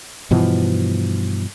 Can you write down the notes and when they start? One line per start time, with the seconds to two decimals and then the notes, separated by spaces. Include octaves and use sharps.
0.31 G2 B2 E3 F3